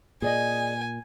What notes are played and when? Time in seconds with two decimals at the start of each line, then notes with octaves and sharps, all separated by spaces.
0.22 A#2 G#4 D5 D#5 G#5